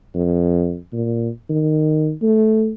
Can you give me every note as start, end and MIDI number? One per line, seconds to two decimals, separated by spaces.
0.15 0.78 41
0.93 1.29 46
1.49 2.12 51
2.22 2.73 57